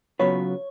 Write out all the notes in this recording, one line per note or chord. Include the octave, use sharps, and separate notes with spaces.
C#3 F#3 B3 F4 B4 C#5